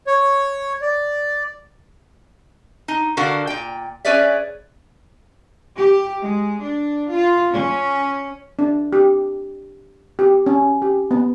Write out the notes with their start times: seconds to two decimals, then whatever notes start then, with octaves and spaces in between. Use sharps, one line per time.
0.07 C#5
0.82 D5
2.88 D#4
3.17 D3 F#4 A#4 F5 F#5
3.47 A#2 G5
4.05 C#4 G#4 B4 C#5 D5 E5
5.75 G4
6.21 G#3
6.62 D4
7.11 F4
7.52 C#4
8.59 D4
8.93 G4
10.19 G4
10.46 C#4
10.82 G4
11.11 B3